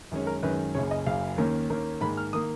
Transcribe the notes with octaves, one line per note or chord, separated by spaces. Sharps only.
F#2 D#3 G#3 C#4
A#4
F#2 D#3 G#3 C#4 B4
F#1 F#2 C#3 C#5
D#5
F#1 F#2 C#3 F5
D#2 D#3 A#3 C#4
D#2 D#3 A#3 C#4
G#2 D#3 A#3 B5
F6
D#3 A#3 D#6